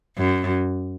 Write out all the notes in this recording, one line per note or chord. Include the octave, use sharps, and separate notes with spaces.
F#2